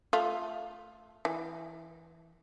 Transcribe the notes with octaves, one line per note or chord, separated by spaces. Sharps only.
A3 F4
E3